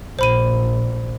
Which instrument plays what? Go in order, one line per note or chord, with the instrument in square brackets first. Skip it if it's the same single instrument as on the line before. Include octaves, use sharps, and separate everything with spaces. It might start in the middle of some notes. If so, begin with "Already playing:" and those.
[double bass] A#1 [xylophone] C5 B5 D#7